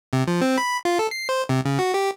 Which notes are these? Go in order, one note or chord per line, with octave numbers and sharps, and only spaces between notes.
C3
F3
C4
B5
F4
A4
C7
C5
C3
C#3
F#4
G4